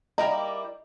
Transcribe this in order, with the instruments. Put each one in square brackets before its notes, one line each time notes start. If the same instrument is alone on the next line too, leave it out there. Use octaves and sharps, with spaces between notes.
[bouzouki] G3 A#3 E4 [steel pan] D#5 A#5